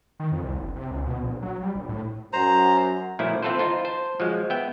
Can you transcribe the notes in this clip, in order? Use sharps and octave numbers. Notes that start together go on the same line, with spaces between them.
D#3
F2
C2
F#1
C3
C#2
B2
A#1
F#3
G3
A#1
A2
F#2 C5 A#5
A#2 F3 F#3 A3 E4
E3 C4 F4 A4 B4 C5
D#4 F4 C5
C5 A5
F3 F#3 G#3
B3 E5 G5